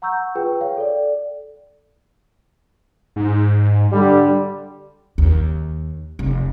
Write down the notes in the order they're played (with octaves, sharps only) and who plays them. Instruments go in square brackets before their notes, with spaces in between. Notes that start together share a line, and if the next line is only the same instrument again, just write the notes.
[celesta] F#5 A#5 C#6 E6 G6
F4 G#4 B4 G5
C#5 F5 G5
A4 D5
[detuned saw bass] G#2
[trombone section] D3 G3
[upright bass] D#2
F1